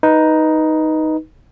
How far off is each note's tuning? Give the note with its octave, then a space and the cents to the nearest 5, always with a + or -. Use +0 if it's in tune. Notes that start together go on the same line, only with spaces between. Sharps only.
D#4 +5 B4 -10